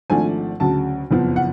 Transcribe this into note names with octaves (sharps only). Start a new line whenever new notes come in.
G#1 G#2 F3 A3 D4 G#5
D2 C#3 F#3 A5
F#1 F2 F3 B3
F#5